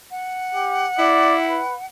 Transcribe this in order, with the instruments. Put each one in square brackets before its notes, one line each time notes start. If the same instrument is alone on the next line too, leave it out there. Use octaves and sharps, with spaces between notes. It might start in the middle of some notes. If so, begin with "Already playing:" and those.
[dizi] F#5
[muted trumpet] G4
[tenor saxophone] E4 [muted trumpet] D5
[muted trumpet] B4